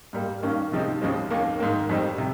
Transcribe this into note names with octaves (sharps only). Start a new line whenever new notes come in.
G#2 G3 A#3
G2 D#3 A#3 C#4
C3 F3 G#3 C4 D#4
D#2 C#3 F3 G#3 C4
D#2 D#3 A#3
G#2 D#3 A#3
F2 D#3 G3 C4 D#4
C3